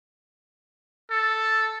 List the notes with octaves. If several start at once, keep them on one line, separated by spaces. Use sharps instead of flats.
A4